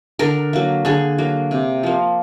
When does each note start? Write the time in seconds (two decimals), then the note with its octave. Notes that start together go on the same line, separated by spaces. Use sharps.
0.19 D3 A#4
0.53 F#3 A#3
0.85 D3 G#4
1.18 F#3 A#3
1.51 C3
1.83 F3 A#3